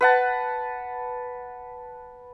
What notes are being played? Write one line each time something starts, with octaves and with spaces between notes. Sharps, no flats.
B4 F#5 A5